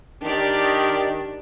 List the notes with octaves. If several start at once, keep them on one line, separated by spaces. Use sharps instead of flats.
D#3 D4 G4 D5